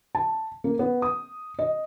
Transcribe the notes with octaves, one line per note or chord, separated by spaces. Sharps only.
A5
A#3
B3
D#6
D#5